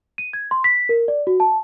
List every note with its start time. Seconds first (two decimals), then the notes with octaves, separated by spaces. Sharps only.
0.18 D#7
0.33 G#6
0.51 C6
0.64 B6
0.89 A#4
1.08 D5
1.27 F#4
1.40 A5